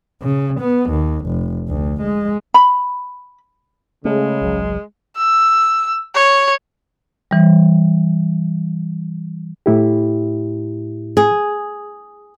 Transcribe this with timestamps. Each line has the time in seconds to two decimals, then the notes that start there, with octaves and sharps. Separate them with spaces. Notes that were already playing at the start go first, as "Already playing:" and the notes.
0.23 C#3
0.60 B3
0.90 D#2
1.26 F1
1.68 D2
2.01 G#3
2.54 B5
4.05 C#3 G#3 A3
4.41 G#1 C#2 F#3
5.17 E6
6.14 C#5
7.31 E3 G3
9.66 A2 E4 G4
11.17 G#4